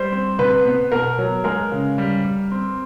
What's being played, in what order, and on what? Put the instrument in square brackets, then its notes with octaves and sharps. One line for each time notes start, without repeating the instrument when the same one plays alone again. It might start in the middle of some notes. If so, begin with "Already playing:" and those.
Already playing: [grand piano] G3 [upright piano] C5
[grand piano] C4
[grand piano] C3 [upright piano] B4
[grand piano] B3
[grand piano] B2 [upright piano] A#4
[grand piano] F#3
[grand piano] G#3 [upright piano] A#4
[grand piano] C#3
G3
G3
C4